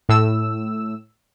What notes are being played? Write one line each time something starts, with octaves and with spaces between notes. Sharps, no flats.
A2 E6